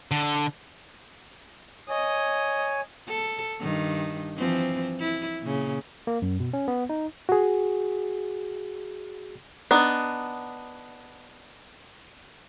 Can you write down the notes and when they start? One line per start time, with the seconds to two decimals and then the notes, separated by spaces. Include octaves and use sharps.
0.11 D3
1.89 C#5 D#5 G#5
3.09 A4
3.61 G2 D#3
4.37 E3 F3 C4
5.00 E4
5.42 A#2 C#3
6.07 A#3
6.22 F#2
6.40 B2
6.53 C#4
6.68 B3
6.89 D#4
7.29 F#4 G#4
9.71 B3 D4 D#4